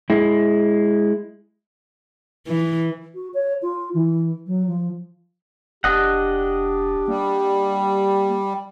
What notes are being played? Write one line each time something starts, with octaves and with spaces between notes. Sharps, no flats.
G#3 E4
E3
F#4
C#5
F4
E3
F#3
F3
F1 D4 G4 D#5 F#5
G3 A#3